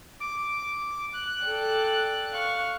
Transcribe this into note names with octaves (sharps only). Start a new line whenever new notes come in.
D6
F#6
A4 D5 G5
F5 C#6